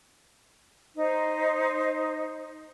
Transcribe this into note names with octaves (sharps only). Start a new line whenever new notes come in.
D#4 C5